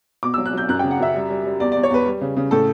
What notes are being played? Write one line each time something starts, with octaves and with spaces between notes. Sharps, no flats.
B2 D6
F#3 E6
F#6
F#3 G6
F#2 F#6
C#3 G5
F#5
F#2 E5
G3
G3
G3
E2 D5
E2 D5
C#5
E2 B4
G3
C#3
C#3
A2 A4